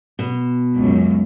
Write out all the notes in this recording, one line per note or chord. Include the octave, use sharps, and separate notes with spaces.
B2
C#2 F#2